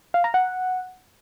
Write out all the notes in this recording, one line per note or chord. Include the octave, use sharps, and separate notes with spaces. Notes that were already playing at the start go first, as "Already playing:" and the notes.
F5
A#5
F#5